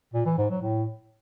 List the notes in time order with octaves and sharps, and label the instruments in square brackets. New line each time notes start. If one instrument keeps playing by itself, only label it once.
[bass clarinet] A#2
E3
G#2
F#3
A2